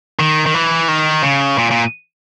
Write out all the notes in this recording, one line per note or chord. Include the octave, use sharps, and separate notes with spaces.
D#3
D#3
E3
D#3
C#3
A#2
A#2